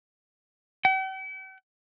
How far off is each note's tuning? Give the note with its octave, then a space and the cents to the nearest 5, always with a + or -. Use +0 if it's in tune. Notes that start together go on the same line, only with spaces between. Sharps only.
G5 -45